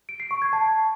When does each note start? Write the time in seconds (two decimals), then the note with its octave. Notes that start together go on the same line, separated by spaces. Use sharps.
0.09 D7
0.20 C7
0.31 C#6
0.42 G#6
0.53 A5